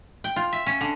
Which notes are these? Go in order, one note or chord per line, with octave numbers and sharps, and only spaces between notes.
G5
F4
E5
C#4
D3